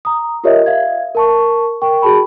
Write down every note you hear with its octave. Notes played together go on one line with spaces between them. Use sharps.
A#5 D#6
F4 G4 A#4 C#5 D#5 E5
E5 F5 G#6
A#4 A5 C#6
A#4 G5 C#6
F#4 G#4 A5 B5